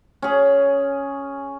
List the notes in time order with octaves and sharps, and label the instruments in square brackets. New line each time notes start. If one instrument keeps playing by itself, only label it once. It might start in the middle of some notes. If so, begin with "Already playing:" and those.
[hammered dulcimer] C#4 G#4